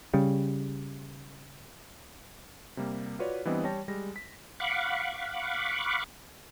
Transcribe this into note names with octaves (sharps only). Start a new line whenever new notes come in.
C#3 G3
C3 G3 A#3
F4 F#4 B4 C#5 D5
E3 G3 B3 C4 D4 D#5
G3 C#5 G5 A5 A#6
G3 G#3 A#6
B6
F5 F#5 B5 C#6 D6